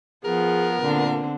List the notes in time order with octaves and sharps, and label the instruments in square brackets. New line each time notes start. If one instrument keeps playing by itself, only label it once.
[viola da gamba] F3 [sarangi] B3 [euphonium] G#4 [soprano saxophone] A#4
[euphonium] A#2 [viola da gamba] D3 C4